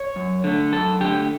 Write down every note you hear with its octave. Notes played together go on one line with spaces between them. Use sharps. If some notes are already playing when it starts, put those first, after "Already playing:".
Already playing: C#5
F#2
D3 A3
F#2 A4
D3 A3 G4